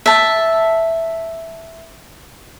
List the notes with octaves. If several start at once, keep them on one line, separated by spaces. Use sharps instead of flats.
E5 A5